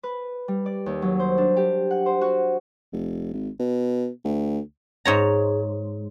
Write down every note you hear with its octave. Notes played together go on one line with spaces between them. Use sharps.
B4
G3
D5
D#2
F#3
C5
D4
G4
F#5
C5
F#4
F1
G#1
B2
D2
G#2 C#5 A#5